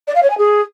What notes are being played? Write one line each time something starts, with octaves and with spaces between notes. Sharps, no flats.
D5
F5
C#5
G#5
G#4